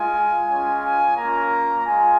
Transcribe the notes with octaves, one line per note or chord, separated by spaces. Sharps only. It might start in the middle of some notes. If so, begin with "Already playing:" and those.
Already playing: G#3 F4 G#5
G#3 C#4 F4 G#5
G#5
A#3 C#4 F4 A#5
G#3 F4 G#5